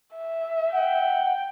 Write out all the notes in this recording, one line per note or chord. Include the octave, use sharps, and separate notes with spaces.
E5
F#5 G5